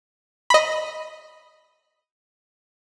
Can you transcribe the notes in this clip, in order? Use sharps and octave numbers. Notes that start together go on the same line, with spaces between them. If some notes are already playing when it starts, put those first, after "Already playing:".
D#5 B5